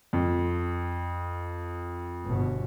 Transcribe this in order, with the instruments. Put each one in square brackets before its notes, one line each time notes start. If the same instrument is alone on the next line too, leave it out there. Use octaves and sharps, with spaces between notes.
[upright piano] F2
[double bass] G1 B2